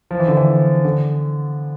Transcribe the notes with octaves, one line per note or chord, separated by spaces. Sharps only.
F3
E3
D3
E3
D3